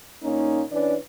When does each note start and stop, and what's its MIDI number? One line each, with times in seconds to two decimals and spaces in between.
0.23 0.63 46
0.23 0.63 58
0.23 0.63 61
0.23 0.63 63
0.71 0.95 52
0.71 0.95 61
0.71 0.95 62
0.71 0.95 71
0.71 0.95 74